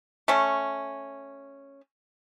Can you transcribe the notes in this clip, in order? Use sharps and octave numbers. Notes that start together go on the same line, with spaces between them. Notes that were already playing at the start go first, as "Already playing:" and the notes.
A3 C#4